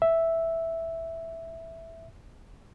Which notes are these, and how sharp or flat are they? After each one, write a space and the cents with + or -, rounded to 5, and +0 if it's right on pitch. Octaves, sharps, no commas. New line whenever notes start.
E5 +0